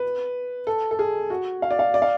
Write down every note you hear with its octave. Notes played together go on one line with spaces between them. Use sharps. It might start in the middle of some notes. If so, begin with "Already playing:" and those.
Already playing: B4
A4
A4
G#4
F#4
F5
D5
F5
D5
F5